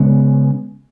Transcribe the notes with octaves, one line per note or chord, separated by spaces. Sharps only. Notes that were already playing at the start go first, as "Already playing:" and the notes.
Already playing: C#3 G#3 B3